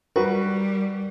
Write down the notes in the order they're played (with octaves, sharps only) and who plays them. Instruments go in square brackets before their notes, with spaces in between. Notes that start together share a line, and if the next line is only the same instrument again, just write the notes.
[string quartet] G3 [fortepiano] F#4 B4 [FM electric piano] A#4